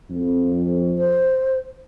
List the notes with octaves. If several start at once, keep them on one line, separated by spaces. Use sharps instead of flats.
F2
C5